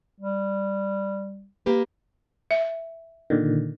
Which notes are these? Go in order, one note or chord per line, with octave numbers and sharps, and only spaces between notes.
G3
A#3 G4 B4
E5
A#2 D3 D#3